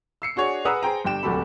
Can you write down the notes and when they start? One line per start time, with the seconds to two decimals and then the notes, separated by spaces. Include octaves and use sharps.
0.22 E6 C7 C#7
0.36 D4 F#4 G#4 C#5
0.65 G#4 B4 F#5 A#5 D#6 E6
0.83 G#4 C5 G5 A#5
1.05 G1 G4 G5 E7
1.23 D1 C2 F#4 G4 A4 B5